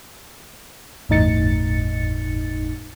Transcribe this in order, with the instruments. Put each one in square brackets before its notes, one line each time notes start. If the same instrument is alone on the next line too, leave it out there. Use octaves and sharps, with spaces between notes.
[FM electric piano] G1 E2 A2 D#4 A6 C#7